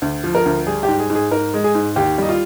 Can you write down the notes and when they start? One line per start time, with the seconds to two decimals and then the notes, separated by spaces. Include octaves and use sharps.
0.02 D2
0.24 F3
0.35 A#4
0.46 D2
0.66 G3 G#4
0.83 G4
0.88 G#2
0.99 G#4
1.10 G#2
1.15 G#4
1.31 G#2 A#4
1.54 G#3
1.64 G#4
1.75 G#2
1.96 D#2 G4
2.18 G3 D#4
2.29 F4